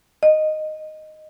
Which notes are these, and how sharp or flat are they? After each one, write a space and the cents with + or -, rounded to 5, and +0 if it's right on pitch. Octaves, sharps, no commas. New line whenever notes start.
D#5 -5